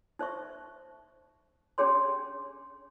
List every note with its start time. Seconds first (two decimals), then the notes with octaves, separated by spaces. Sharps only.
0.19 D#4 C5 E5 C#6
1.78 C#4 D4 G4 G#4 C#5 C6